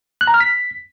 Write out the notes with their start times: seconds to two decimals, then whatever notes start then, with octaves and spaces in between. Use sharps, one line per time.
0.21 F#6
0.27 A#5
0.34 F6
0.40 B6